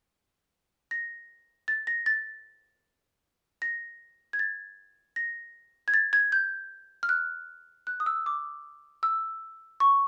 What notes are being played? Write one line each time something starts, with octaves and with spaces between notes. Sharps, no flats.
A#6
A6
A#6
A6
A#6
G#6
A6
A#6
G#6
A6
G#6
G6
F6
F#6
F#6
D#6
E6
D6
E6
C#6